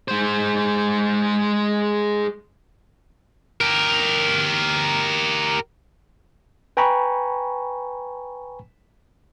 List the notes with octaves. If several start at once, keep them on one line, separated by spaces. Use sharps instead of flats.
G#3 C5
G4 A#4
B4 G5 G#5 A#5 B5 C#6